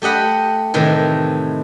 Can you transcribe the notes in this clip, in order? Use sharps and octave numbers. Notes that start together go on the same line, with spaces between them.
A3 G4 D#5 F#5 B5
A2 C3 D#3 E3